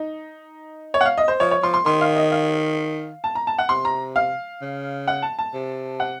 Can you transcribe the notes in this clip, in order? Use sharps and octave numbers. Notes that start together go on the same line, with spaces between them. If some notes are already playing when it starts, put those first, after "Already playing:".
Already playing: D#4
C#5
F#5
F5
D#5
C5
F3 C#5
C#5
F3 C6
C6
D#3 C6
F5
D#5
F5
A5
A#5
A5
F#5
C3 C6
A#5
F5
C#3
F#5
A5
A5
C3
F#5